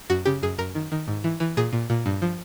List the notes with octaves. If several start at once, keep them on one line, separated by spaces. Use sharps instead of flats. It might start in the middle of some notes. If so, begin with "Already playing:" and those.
F#2 F#4
C#3 G4
F#2 G#4
F#2 A#4
D#3
D#3
G#2
E3
E3
A#2 G#4
A#2
A#2
G2
F3